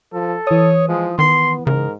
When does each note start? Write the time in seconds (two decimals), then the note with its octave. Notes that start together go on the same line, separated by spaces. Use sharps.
0.13 F3 A4
0.47 E3 C#5 D#6
0.89 F3 G#3
1.19 D#3 B3 C6
1.67 G#2 C#3 A#4